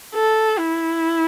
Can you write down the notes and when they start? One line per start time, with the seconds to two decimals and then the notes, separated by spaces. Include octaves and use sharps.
0.15 A4
0.59 E4